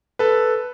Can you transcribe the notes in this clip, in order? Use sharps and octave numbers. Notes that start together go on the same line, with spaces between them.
A4 B4